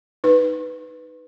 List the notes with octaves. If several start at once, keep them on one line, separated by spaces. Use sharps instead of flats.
D#4 B4